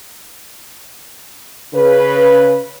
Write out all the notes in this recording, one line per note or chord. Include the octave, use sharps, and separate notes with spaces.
C#3 B4